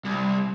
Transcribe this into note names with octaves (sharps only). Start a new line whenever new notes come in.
C2